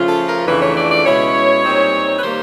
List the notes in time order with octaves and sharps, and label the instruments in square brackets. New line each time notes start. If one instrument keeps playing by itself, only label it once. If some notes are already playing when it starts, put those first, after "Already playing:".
Already playing: [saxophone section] C#3 F3 A3 C#4 F4
A4
A#4
F2 C#3 E3 A3 D4 B4
C#5
D5
D5
B2 G#3 C#4 E4 C#5
A#2 G3 C4 D#4
B4
D#3 G3 A#3 C5